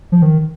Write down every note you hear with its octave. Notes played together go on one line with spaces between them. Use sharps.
F3
D#3